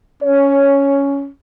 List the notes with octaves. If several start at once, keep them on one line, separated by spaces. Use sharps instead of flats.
C#4 C#5